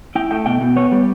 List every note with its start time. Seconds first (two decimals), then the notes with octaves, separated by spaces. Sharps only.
0.15 E4 G5
0.31 A3 G5
0.46 B2 G5
0.61 B2
0.76 B3 C#5
0.92 G3